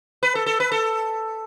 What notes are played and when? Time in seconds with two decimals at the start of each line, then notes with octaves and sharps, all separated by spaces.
0.23 B4
0.35 A4
0.46 A4
0.60 B4
0.72 A4